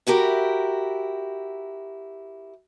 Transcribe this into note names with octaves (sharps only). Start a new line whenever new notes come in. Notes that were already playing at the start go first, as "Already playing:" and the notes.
E4 F#4 G4 A#4